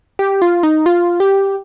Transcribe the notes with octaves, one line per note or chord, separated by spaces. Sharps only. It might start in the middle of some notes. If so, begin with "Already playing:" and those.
G4
F4
D#4
F4
G4